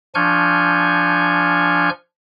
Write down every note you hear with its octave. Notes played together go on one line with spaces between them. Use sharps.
F3 D4 G#5 C#6 F6 G6